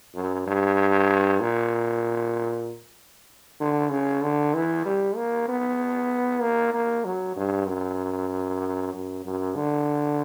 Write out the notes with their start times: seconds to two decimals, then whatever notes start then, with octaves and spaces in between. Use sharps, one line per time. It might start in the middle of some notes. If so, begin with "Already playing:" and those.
0.15 F#2
0.47 G2
1.40 A#2
3.60 D3
3.91 C#3
4.23 D3
4.54 E3
4.85 G3
5.16 A#3
5.48 B3
6.42 A#3
6.74 A#3
7.05 F#3
7.36 G2
7.67 F#2
8.93 F#2
9.25 F#2
9.56 D3